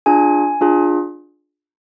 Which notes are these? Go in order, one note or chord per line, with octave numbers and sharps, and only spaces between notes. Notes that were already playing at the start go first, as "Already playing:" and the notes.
D4 F4 G#4 G#5
D4 F4 G#4